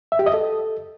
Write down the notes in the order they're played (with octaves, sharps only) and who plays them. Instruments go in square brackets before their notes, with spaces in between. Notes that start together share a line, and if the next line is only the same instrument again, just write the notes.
[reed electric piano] E5
G4
D#5
A4